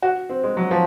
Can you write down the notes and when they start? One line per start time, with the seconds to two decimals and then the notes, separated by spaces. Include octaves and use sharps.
0.02 F#4
0.29 C4
0.44 G#3
0.57 F#3
0.71 F3